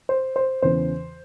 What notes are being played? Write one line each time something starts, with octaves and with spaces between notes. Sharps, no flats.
C5
C5
E2 C#3 E3 C5